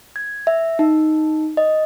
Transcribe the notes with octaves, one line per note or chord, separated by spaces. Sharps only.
G#6
E5
D#4
D#5